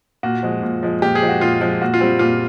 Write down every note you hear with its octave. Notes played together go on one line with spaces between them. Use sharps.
A#2 F#4
F3 G#3
A#2
F3 G#3
A#2 G4
G#4
F3 G#3
F#4
A#2 F4
F3 G#3 F4
A#2 F#4
F4
G3 C4
A#2 F4